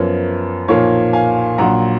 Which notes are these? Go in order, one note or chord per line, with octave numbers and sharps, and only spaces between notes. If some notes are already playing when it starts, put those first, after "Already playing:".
Already playing: F#2 F3 B3 A#4 C#5
B1 A#2 F3 A#3 C#5 F5
F5 G#5
A#1 A#2 F#3 F#5 A#5